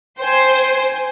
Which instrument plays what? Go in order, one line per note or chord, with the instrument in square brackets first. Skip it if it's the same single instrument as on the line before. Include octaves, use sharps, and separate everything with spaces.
[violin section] C5 [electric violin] G5 G#5